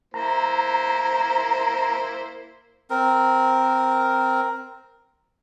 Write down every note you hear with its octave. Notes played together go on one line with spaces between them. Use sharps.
A#3 E4 C5 A#5
C4 A#4